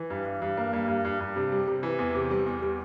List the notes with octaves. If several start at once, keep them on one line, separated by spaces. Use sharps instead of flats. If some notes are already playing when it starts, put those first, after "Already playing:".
Already playing: E3
G2
G2
G2
A#3
G2
G2
G2
G2
C3
G3
C3
E3
E2
C3
G3
E2
G3